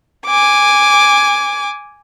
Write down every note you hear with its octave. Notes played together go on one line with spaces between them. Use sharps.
G#5 D6